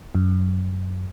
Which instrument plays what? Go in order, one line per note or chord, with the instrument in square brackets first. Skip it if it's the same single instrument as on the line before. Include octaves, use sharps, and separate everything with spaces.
[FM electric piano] F#2